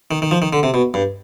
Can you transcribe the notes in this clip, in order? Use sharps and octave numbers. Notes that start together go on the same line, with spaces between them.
D#3
D#3
F3
D#3
D3
C3
B2
G2